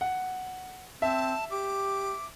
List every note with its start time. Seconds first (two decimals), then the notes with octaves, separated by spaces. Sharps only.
0.01 F#5
1.02 C4 E5 A5
1.51 G4 D6